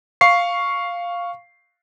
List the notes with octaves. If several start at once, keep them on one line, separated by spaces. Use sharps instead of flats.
F5 C#6 C7